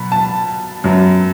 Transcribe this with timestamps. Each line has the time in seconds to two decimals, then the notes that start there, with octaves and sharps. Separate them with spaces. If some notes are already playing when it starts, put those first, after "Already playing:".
Already playing: B2 F#3 B5
0.12 A5
0.84 F#2 F#3 B3